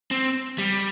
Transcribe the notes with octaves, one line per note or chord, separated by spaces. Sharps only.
C4
G3